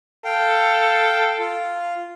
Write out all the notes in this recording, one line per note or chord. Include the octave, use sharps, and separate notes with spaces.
A4 F5 G5
F4